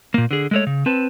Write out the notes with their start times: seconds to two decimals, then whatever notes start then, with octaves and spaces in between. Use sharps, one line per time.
0.14 A#2 A#3
0.31 D3 G#4
0.51 G#3 A3 C#5
0.67 C#3
0.86 C4 B4 A5